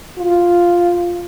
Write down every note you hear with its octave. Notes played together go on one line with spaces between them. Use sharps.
F4